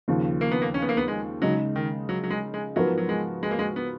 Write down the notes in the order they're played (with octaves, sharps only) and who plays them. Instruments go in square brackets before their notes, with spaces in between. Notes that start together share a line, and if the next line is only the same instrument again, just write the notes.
[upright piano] D#2 C#3 F3
[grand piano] A#3
B3
A#3
C#4
B3
A#3
B3
G#3
[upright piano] C#3 G#3 D#4 [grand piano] F#3
[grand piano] D#3
F#3
F#3
G#3
G#3
[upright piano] G#2 F3 B3 F#4 A#4 [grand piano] F#3
[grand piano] F#3
G#3
G#3
A#3
G#3
B3